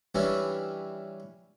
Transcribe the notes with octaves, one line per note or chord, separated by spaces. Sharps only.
E3 G3 C#4 D4 E4